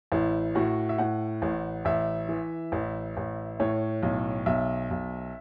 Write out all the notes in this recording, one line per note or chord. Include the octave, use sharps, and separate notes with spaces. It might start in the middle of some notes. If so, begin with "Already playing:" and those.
A1 E4
A2 F#4
E5
A2 F#5
A1
A1 E5
E3
A1
A1
A2 C#5
B1
B1 E5
B1